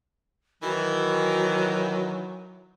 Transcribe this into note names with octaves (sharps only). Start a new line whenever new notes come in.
D#3 E3 F#3 F#4